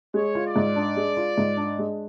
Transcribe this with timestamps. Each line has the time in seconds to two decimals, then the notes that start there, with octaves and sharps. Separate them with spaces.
0.14 G#3 C#5
0.35 F4
0.45 D5
0.56 G#2
0.76 D4
0.97 G#3
1.17 F4
1.38 G#2
1.57 D4
1.79 G#3